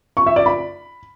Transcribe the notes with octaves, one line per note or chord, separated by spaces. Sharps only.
C#6
E5
D5
B5